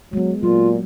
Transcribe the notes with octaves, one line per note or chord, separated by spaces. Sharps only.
F#3 G#3 B3
A#2 F#3 F4